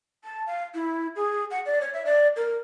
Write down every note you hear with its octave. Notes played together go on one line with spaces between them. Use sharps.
A5
F5
E4
G#4
F#5
D5
C#5
E5
D5
A#4